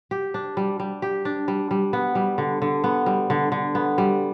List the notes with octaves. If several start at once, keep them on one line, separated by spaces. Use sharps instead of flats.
G4
D4
G3
G3
G4
D4
G3
G3
B3
G3
D3
D3
B3
G3
D3
D3
B3
G3